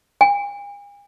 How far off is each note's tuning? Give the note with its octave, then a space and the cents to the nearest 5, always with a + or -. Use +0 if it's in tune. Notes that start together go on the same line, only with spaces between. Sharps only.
G#5 -45